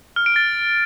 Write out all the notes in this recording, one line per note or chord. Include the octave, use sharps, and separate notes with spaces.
F6
D7
A6